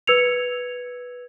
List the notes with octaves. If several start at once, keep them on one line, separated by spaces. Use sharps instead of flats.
B4 E6 G#6 C#7 F7